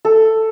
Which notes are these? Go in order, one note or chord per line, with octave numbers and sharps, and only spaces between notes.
A4